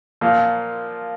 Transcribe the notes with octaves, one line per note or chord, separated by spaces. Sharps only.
A#2 F3 A#3